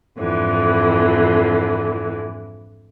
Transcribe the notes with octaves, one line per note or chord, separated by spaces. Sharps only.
F2 G#2 D3 E3